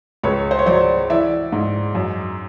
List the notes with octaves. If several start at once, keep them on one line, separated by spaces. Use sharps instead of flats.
C#2 B4 C#5
C5
C#5
F#3 C5 D5
E3 D5 E5
G#2
F#2